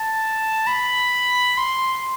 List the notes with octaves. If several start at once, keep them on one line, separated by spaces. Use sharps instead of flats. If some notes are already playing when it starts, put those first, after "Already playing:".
Already playing: A5
B5
C6